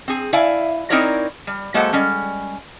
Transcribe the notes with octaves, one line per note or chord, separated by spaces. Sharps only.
C4 G#4
E4 D5 E5 F5 G#5
C4 D#4 E4 A#4 C#5 D5
G3
F#3 G#3 A#3 A4 C5 F#5
G3 G#3 C#4